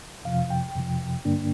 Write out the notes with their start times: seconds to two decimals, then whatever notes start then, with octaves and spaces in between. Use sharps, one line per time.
0.25 F2 C3 F3 F5
0.50 G5
0.75 F2 C3 F3
1.25 G2 D3 A#3 D4